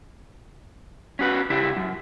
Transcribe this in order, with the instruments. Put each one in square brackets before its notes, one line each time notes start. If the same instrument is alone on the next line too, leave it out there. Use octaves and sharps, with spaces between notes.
[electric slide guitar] C#4 F#4 B4
C#3 E4 G4
F#2